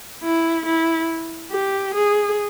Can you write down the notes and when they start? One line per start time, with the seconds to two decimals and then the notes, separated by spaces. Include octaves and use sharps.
0.23 E4
0.66 E4
1.52 G4
1.95 G#4